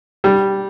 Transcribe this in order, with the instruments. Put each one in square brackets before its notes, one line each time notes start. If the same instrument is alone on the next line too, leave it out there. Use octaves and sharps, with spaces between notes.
[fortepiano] G3